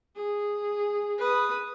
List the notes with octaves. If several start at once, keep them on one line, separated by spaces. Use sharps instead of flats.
G#4
B4 D#6